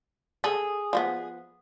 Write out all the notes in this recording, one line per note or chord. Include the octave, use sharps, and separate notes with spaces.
G#4 A4
F3 A#3 B3